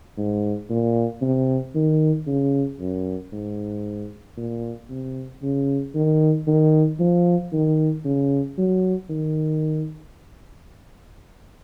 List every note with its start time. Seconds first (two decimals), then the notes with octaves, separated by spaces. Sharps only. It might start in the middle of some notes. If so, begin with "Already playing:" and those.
0.17 G#2
0.70 A#2
1.21 C3
1.75 D#3
2.27 C#3
2.80 F#2
3.33 G#2
4.37 A#2
4.90 C3
5.43 C#3
5.95 D#3
6.47 D#3
7.00 F3
7.53 D#3
8.05 C#3
8.58 F#3
9.09 D#3